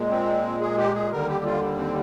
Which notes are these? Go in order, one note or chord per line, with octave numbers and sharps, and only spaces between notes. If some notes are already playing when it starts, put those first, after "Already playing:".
Already playing: A#2 G#3
C4
G#4
G4
G#4
D#2 D3 G3 A#4
G4
F4
C4